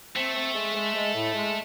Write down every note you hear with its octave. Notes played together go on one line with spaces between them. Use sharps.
A3 C4
C4
G#3
G#3
G#3
A2
G#3